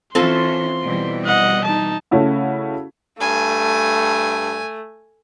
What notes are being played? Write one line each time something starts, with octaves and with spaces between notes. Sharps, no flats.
E3 C4 C#4 F4 A4 C6
B2 E3 G3
D#5 F#5
D#4 A5
C#3 A3 C#4 E4 F#4
G2 A3 G#5